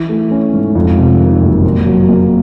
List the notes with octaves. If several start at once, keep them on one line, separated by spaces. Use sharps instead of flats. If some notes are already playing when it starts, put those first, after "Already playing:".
Already playing: E3
A3
C#4
G#2
F2
C3
D#3
F#1
A#2
F#3
A#3